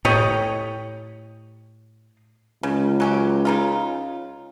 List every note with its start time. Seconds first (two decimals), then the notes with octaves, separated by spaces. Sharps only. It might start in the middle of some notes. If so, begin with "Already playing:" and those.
0.05 A2 G4 C#5 D#5
2.63 C#2 C#3
3.00 F#3 C#4 G4
3.45 C#3 D#4 F4